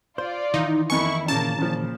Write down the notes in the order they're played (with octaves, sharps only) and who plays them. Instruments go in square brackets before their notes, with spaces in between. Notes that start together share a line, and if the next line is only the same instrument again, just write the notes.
[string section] F4 D5 [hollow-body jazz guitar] C5
[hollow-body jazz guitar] D#3 E3 [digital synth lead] D#4
[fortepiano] F2 A#3 G#5 [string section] E4 [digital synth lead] C#6
[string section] A#2 A#3 [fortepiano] C#3 [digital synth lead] A5
[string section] A#2 [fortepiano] C#3 F3